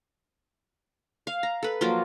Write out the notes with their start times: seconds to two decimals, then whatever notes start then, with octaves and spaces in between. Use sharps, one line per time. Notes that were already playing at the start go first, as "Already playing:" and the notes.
1.27 F5
1.43 A#5
1.63 A4 B4
1.81 F3 F#3 A#3 F4